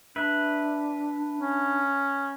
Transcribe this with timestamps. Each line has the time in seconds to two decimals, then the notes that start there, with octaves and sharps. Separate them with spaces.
0.16 D4 B4 E5
1.41 C#4